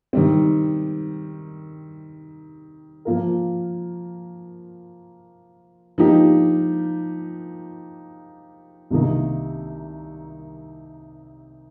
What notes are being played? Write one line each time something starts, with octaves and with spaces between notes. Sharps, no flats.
D#3 G3 C4
F3 A#3 F4 A#4
F3 A#3 D#4 G4
C2 C3 D#3 A#3 D#4